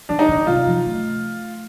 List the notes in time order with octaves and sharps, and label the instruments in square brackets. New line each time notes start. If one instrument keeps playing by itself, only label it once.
[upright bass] D#3 [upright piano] D4
[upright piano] D#4
[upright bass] D3
[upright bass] C3 [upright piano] F4
[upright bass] F3
A3